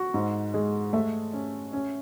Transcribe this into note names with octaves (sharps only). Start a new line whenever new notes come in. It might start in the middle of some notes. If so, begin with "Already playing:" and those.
Already playing: F#4
G#2
G#3
A3 E5
C#4
C#4